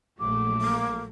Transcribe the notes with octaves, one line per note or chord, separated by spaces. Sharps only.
A#1 F#3 A3 D6
A#3